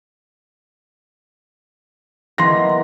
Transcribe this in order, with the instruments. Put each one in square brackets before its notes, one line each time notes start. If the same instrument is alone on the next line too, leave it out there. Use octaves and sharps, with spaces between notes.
[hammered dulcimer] D#3 A#3 B3 [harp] E3 [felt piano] C6 A#6